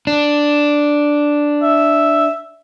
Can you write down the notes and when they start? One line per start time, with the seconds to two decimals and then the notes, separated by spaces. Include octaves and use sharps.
0.07 D4
1.63 E5